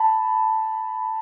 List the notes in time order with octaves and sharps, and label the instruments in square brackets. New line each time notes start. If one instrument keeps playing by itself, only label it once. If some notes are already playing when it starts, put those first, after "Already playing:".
Already playing: [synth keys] A5 B5